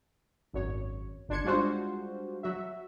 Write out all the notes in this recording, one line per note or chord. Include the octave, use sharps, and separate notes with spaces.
G#1 F#2 C#5
G1 D4 C6 G#6 C#7
G3 G#3 D4 F4 F#4 C5
F#3 F#4 E5